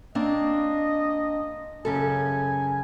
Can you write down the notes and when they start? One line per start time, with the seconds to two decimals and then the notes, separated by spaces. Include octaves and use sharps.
0.15 A#3 C4 D4 D#5
1.85 F#2 C#3 A4 G#5